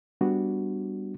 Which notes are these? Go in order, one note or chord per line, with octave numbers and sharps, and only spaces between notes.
G3 B3 D4 F#4